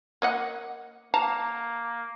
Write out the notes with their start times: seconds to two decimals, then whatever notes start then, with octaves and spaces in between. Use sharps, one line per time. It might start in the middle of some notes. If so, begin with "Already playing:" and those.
0.22 A#3 D#5 F#5
1.14 A#3 F5 A5 A#5